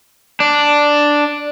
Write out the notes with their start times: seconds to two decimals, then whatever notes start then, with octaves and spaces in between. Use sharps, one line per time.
0.40 D4